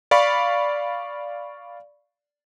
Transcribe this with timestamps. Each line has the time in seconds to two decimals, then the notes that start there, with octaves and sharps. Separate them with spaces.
0.11 D5 F5 B5 C#6